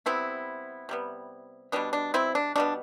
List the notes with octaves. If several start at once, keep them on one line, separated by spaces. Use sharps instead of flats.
C3 G3 B3 C4 E4
C3 G3 B3
B2 G3 B3 D4
D4
C4 E4
D4
B2 G3 B3 D4